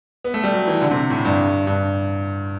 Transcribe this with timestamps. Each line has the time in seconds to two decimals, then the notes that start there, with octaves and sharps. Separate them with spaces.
0.24 B3
0.34 A3
0.44 G3
0.53 F#3
0.67 E3
0.82 D3
0.91 C3
1.10 A2
1.25 G2
1.67 G2